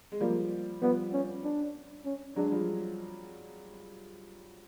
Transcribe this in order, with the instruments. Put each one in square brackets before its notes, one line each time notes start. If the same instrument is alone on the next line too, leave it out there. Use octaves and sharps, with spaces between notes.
[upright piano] G#3
[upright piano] F3 G3 [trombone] A#3
[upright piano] F3 G3 [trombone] B3
[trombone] C#4
D4
C#4
[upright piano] F#3 G#3 [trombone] D4
[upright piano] F3 G3